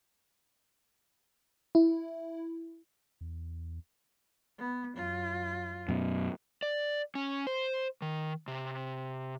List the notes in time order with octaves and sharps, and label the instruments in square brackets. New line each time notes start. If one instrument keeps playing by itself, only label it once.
[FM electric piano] E4
[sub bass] E2
[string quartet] B3
F#2 F4
[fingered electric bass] F#2 B2
[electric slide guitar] D5
C#4
C5
D#3
C3